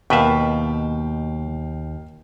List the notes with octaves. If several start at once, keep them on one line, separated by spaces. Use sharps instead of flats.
D#2 B2 B4 E5 F5 G5